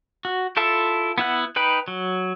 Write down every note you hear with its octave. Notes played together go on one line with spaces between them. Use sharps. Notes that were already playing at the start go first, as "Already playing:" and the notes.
F#4
E4 F4 A4 E5
B3 E4 F#5
D#4 B4 G5 B5
F#3